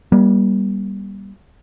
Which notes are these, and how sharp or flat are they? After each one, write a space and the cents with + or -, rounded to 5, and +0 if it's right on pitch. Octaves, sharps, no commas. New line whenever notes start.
G3 +0 A#3 +45